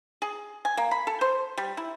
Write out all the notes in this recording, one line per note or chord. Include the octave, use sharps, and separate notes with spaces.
G#4
G#5
A#3
B5
A4
C5
G3
E4